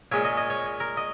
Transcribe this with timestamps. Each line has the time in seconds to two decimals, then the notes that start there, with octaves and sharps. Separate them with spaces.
0.12 A#2 G#3 C#4 C#5
0.25 D#5
0.37 D#5
0.50 C#5
0.80 A#4
0.97 D#5